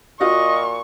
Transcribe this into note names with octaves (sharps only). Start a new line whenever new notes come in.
A#2 F4 F#4 D#5 C#6